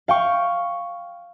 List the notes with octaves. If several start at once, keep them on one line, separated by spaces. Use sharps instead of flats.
F5 G5 C#6